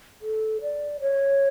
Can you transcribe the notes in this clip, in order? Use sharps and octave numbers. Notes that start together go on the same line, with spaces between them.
A4
D5
C#5